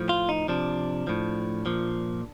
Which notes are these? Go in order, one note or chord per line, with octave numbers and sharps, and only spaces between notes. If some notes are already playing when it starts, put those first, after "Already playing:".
Already playing: A2 F3
F4
D#4
C3 F3 D4
A2 F3
A#2 F3